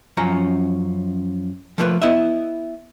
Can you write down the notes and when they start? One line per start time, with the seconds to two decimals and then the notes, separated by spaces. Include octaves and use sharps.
0.17 F#2 F3 C#4 A#5
1.78 F3 A3 A#3 F4 G4 B4
2.02 B3 E4 D#5 E5